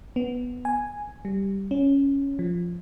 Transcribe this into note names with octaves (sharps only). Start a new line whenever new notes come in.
B3
G#5
G3
C#4
F3